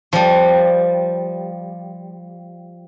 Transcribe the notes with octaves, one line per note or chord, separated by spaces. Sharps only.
F3 G3